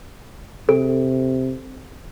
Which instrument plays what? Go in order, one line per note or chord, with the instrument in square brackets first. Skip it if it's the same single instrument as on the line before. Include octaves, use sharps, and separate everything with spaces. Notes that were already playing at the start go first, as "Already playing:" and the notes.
[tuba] C3 [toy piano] A4